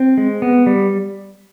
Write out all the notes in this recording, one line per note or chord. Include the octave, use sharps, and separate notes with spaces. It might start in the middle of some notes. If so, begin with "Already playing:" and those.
Already playing: C4
G#3
B3
G3